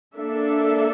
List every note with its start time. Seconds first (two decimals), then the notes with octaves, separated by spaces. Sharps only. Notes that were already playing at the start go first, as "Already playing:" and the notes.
0.16 A#3 D4 A4 E5